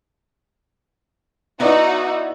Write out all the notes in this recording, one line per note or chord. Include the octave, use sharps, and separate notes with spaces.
B3 D#4 E4 F#4 D5